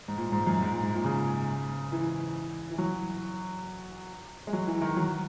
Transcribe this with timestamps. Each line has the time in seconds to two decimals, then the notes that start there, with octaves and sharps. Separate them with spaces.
0.08 G#2
0.17 A#2
0.32 G#2
0.47 F#2
0.61 G#2
0.72 A#2
0.83 G#2
0.94 A#2
1.05 C#3
1.92 E3
2.71 E3
2.78 F#3
4.47 G#3
4.53 F#3
4.67 E3
4.82 D#3
4.96 F#3